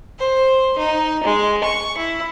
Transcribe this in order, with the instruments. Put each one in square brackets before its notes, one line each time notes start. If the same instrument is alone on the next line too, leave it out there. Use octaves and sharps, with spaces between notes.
[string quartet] C5
D#4
G#3
C#6
E4